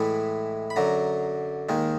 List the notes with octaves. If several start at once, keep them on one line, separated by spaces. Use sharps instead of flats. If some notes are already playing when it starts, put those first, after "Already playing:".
Already playing: A2 E3 G#3 B5
B5
F#2 D3 F#3 A#5
D#2 D#3 G#3